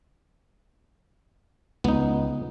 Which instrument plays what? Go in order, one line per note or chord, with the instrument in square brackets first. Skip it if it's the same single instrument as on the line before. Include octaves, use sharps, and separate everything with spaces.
[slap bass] C#2 [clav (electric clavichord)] B3 D#4